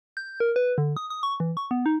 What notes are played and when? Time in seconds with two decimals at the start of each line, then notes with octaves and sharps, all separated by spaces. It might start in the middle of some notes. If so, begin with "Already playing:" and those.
0.17 G6
0.40 A#4
0.56 B4
0.78 D3
0.97 D#6
1.10 D#6
1.23 C#6
1.40 E3
1.57 C#6
1.71 B3
1.86 D#4